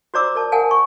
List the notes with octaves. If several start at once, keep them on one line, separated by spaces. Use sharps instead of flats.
F#4 C5 D5 A#5 D6 E6
A#4 D5 A5
A#4 F#5 G#5 A5
C#6